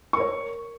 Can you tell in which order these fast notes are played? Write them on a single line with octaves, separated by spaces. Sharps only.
C#6 A#4 C#5